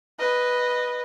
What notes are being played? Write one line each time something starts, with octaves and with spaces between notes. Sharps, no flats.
B4 D#5